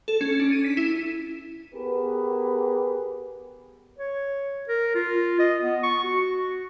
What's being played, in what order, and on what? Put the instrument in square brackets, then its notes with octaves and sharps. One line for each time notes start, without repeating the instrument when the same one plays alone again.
[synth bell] A4
C#4
D4
D#7
B6
E4
[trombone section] B3 G4 G#4 A#4 B4
[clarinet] C#5
A#4
F4
D#5
B3
C#6
F#4